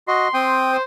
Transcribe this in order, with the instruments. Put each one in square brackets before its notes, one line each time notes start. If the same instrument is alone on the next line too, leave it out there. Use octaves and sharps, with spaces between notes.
[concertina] F#4 D#5 [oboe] C6
[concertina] C4 G5 D#6
[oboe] C5